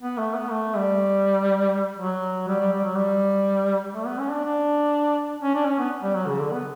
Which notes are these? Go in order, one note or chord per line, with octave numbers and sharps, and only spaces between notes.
B3
A3
B3
A3
G3
F#3
G3
G3
G3
F#3
G3
A3
B3
C#4
D4
D4
C#4
D4
C#4
B3
G3
F#3
C#3
D3
B3